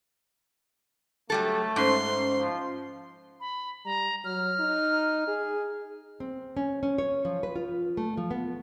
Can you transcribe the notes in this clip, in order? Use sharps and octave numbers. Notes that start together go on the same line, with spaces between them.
F#3 G3 A3 A4
G#2 C#4 C5 C6
F3
B5
G3 A#5
F#3 F6
D#4
G#4
C4
C#4
C#4
C#5
F3
B4
F4
A3
F3
B3